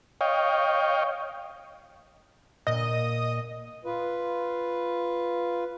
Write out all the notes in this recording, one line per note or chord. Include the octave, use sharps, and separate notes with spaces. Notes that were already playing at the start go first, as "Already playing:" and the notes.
C#5 D#5 F5 G5
A#2 D#5
F4 B4